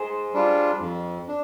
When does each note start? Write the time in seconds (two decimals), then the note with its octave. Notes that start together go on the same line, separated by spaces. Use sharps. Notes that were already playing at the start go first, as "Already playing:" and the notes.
Already playing: G#4 C5
0.33 G3 D4 F4
0.80 F2
1.28 D4